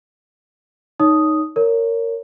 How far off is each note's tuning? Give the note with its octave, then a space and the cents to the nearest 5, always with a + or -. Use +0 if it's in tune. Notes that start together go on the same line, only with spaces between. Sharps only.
D#4 +0 C#5 +25 D#6 +0
A#4 -15 C#5 +15